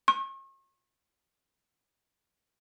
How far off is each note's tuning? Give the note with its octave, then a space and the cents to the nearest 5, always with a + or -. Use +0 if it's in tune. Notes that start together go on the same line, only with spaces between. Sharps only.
C#6 -40